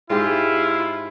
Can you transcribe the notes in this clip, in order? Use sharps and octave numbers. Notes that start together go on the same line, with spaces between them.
G#2 G#3 E4 F4 G4